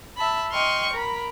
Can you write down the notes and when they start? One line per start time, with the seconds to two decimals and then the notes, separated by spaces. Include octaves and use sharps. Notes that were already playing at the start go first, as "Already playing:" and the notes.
0.16 E5 A5 B5
0.51 D#5 G5 C6 C#6 F6
0.92 A#4 B5